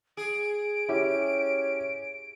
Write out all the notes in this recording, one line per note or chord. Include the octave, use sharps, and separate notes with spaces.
G#4 D7
C#4 E4 G4